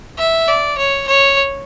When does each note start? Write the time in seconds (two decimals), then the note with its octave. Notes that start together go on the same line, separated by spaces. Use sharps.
0.18 E5
0.48 D5
0.78 C#5
1.07 C#5